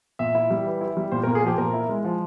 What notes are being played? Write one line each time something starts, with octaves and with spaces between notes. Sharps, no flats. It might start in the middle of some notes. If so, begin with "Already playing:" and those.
A#2 E5
E4
G3
E3
E4
G3
A#2 C5
A#4
A#2
G#4
F3 G4
A#2 A#4
E4
G#3
F3